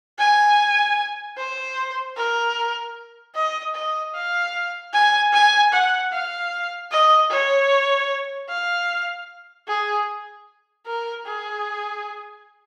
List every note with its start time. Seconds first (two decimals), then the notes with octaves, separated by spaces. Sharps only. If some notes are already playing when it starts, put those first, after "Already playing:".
0.19 G#5
1.37 C5
2.17 A#4
3.35 D#5
3.74 D#5
4.14 F5
4.93 G#5
5.33 G#5
5.72 F#5
6.12 F5
6.91 D#5
7.30 C#5
8.49 F5
9.68 G#4
10.86 A#4
11.26 G#4